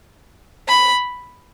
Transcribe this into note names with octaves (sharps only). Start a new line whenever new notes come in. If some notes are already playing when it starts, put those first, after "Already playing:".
B5